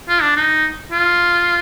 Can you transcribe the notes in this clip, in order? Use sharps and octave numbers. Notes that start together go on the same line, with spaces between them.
F4
D4
D#4
F4